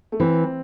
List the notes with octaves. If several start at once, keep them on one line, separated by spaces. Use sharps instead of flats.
A3
E3 C4